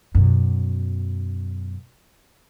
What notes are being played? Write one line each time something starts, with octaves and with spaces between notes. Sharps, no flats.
F#2 B2